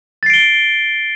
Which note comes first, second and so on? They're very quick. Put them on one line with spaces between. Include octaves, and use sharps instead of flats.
A6 C7 D7 G7